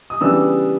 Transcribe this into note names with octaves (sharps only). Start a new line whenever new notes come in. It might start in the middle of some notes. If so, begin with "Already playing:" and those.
D#6
C#3 E3 G3 B3 D4 E6